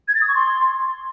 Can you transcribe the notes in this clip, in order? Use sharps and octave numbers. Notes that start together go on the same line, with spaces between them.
G#6
A6
D#6
C#6
C6